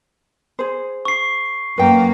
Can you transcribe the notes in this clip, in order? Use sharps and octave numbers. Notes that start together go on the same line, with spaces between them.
G#4 C5
C#6 C7
F#2 A#3 B4 G5